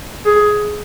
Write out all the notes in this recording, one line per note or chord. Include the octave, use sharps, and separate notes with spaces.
G#4